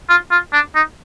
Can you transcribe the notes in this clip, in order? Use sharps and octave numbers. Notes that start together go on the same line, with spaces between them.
F4
F4
D4
D#4